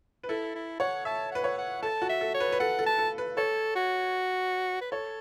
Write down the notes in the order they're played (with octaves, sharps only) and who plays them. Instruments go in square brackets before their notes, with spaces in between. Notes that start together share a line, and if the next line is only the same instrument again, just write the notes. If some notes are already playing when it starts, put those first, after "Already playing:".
[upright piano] B4
[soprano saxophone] E4 [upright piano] A4
[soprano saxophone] E4
[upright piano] C#5 [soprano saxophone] F#5
[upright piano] E5 [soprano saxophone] A5
[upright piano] B4 [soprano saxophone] F#5
[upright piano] C#5
[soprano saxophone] F#5
[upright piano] A4 [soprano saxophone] A5
[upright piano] F#4
[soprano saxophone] E5
[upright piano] A4
[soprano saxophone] C#5
[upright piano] B4
B4
[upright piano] A4 [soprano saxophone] F#5
[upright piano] A4
[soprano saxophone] A5
[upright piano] A4
B4
[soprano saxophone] A4 [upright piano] C#5
[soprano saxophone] F#4
B4
[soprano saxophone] A4 [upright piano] C#5